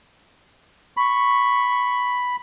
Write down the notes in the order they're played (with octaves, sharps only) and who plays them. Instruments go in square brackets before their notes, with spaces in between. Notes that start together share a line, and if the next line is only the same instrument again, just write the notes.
[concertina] B5 [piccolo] C#6